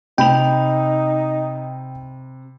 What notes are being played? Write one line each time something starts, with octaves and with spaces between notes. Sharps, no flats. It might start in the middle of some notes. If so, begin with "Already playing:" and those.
C3 D#4 G5 B5 F7